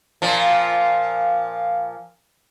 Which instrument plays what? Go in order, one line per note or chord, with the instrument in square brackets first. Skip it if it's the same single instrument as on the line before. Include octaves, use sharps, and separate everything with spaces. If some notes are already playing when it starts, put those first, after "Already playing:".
[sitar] A#2 F3